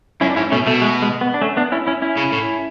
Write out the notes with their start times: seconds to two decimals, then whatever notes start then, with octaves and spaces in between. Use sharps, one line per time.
0.21 F#2 C#4 E4
0.30 D4
0.36 G#2 C#4 E4
0.52 B2 A3 C#4
0.66 B2 A3
0.82 G#3
1.02 G#3
1.21 B3
1.34 D4
1.42 A3 C#4
1.57 B3 D4
1.72 C#4 E4
1.87 C#4 E4
2.02 C#4 E4
2.17 C#3
2.32 A2